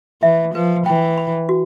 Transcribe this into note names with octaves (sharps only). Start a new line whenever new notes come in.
E3 E5
F3 B4
E3 G5
B5
F#4